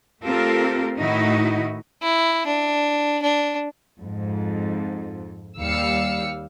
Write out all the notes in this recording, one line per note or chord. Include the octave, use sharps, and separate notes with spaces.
A3 C4 F4 G4 A4 A#4
A2 D#3 D#4 E4 F#4 D#5
E4
D4
D4
F2 G#2
D#2 G3 F5 E6 C#7